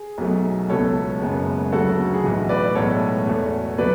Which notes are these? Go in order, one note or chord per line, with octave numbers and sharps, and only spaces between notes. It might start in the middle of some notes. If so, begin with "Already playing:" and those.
Already playing: G#4
B1 B2 F#3 A3
C#2 B2 F#3 A3 A4 C#5
F#1 F#2 C#3 G#3 B3
D2 C#3 F#3 B3 F#4 A4
G#4
B1 A2 E3 F#4
B4 D5
B1 A2 G#3 B3 A4 C#5
E2 B2 A3
D3 F#3 A3 B4 D5